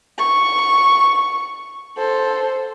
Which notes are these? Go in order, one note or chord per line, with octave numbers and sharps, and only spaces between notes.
C#6
A4 C5